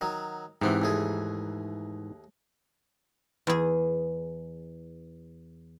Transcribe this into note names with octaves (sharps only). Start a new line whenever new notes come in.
D#3 F#3
G#2 C3 E3 B3
D#2 A3 G#4
E2 G#4